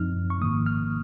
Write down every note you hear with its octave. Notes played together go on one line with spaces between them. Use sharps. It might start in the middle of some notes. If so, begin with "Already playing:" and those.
Already playing: F#2 F3 C4 D#4 F6
C#6
G#1 G#2 D#3 A#3 D#6
F6